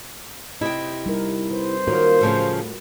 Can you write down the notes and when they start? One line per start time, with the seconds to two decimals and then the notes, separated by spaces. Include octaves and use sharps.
0.61 C3 E4 D#5 G5
1.06 G3 D#4 A#4
1.51 B4 C5
1.87 D#3 A#3 C#4 F4 F#4 A#4
2.21 A2 C#3 F3 A3